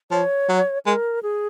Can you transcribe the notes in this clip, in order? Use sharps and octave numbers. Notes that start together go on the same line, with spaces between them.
F3 C#5
F#3
G#3 A#4
G#4